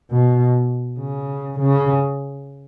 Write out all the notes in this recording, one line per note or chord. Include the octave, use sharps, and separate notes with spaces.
B2
C#3
C#3